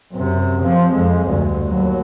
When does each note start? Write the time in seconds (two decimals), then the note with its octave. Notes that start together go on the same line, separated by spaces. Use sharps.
0.12 F#2 C3
0.62 F3 C4
0.93 F2 G#3
1.27 D2 G2
1.67 D#2 F#3